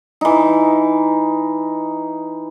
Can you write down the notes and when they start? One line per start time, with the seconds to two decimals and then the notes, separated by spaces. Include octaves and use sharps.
0.21 E3 D#4